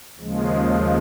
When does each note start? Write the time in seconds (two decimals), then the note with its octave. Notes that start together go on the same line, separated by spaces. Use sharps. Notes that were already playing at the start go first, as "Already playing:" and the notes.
0.19 D#2 C#3 F3 G#3